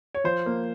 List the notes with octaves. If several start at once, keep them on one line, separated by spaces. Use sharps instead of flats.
C#5
F3 C5
A#3